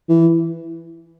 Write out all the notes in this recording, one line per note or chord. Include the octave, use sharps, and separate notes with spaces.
E3